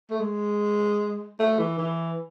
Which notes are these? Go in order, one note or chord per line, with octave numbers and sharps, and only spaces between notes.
A3
G#3
A3
E3
E3